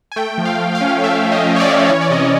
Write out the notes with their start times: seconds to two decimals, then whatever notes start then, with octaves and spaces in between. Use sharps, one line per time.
0.12 G#5
0.16 A3 G5
0.38 F3
0.45 F5
0.60 F3
0.75 F5
0.81 C#4
1.04 A3 E5
1.24 F3
1.32 D#5
1.46 F3
1.56 C#5
1.60 D5
1.67 C#4
1.89 E3 C#5
2.01 D5
2.10 C3 D#5